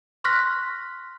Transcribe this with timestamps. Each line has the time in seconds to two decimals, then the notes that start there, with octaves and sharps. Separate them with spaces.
0.24 C6 C#6 F6 F#6 A#6 B6